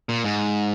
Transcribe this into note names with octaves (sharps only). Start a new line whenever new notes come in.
A#2
G#2